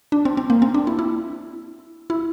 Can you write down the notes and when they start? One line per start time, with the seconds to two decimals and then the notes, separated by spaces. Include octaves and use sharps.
0.12 D4
0.25 C4
0.37 C4
0.50 A#3
0.62 C4
0.74 D4
0.87 E4
0.99 E4
2.10 E4